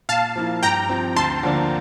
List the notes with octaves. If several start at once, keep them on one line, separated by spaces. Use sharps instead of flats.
A#2 F5 A5
F3 A#3 E4
G2 G5 A#5
F3 C4
D2 A5 C6
D3 F3 A#3 D4